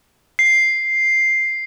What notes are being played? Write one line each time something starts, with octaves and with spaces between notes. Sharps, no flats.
C7